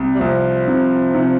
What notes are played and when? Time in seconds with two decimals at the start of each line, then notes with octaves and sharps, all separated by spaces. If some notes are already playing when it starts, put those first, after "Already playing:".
Already playing: C2 C3
0.15 G3
0.21 C2 F3
0.68 C3
1.15 C3